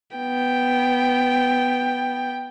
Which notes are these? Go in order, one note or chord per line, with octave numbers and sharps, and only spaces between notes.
B3 G5